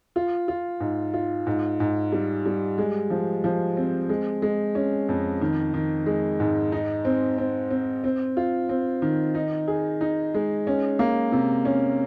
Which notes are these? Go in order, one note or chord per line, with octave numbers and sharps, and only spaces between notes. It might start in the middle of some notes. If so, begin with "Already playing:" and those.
F4
F4
G#2
F4
G#2
G#2
G3
G3
G#3
F3
F3
C4
G#3
G#3
C#4
F2
D#3
D#3
G#3
G#2
D#4
C4
C4
C4
C4
F4
C4
D#3
D#4
G#4
D#4
G#3
C#4
A#3
C3
C#4